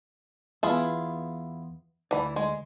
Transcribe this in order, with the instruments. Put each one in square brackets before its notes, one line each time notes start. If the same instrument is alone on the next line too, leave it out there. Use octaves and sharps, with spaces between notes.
[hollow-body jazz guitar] E2 B3 [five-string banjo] E4 F4 G#4
[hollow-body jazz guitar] D2 D5 [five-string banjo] E3 B5
[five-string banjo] G#3